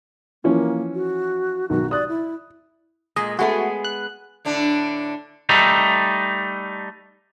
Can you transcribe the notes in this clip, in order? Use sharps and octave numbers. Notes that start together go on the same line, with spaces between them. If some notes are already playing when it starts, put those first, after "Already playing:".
E3 F3 A#3 C#4
F#4
B1 D#3 F#4
D5 D#6 F#6
E4
A#2 G#3 D#5
G#3 A3 B3 F#4 G#4
F#6
A2 D3 D4
G3 A3 D#4